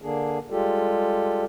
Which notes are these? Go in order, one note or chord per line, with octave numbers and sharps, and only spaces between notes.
D3 A#3 D4 G#4
G3 G#3 F4 G4 A4